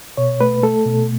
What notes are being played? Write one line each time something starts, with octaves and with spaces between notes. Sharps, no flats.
B2 C#5
A3 B4
A3 A4
B2